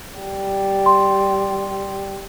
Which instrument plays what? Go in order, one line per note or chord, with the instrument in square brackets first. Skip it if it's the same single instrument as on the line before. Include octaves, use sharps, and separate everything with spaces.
[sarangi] G3
[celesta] C6